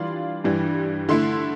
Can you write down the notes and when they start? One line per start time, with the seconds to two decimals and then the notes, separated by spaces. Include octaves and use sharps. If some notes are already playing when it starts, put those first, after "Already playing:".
Already playing: E3 G3 D4 F4 C6
0.44 G2 E3 G3
1.09 D3 A3 E4 C6